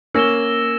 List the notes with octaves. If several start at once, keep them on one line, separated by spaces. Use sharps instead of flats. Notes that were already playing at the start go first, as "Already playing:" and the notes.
A#3 C#4 E6 A#6 E7 G7